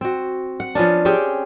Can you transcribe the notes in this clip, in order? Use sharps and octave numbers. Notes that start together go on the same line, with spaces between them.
C4 F#4
F#5
F3 B3 C#4 D4
C4 C#4 G4 G#4